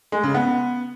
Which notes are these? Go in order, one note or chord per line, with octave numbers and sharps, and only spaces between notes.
G#3
C#3
B3